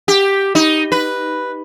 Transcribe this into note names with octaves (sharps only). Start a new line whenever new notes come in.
G4
D#4
B4